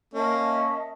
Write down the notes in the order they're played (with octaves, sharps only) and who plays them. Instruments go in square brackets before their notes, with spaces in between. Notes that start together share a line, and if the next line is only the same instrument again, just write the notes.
[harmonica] A#3 [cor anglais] C#4 [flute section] D#5 E5 A5